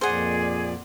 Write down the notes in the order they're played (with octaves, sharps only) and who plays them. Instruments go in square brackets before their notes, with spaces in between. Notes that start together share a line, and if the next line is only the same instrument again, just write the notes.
[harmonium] F2 A#2 D5 [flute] G#4 [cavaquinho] C5 F#5